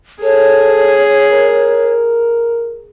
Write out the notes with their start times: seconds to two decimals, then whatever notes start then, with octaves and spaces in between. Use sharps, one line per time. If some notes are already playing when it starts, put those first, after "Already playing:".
0.23 G#4 A4 C#5
1.31 A#4